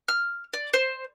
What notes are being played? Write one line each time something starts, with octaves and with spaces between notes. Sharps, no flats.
F6
D5
C5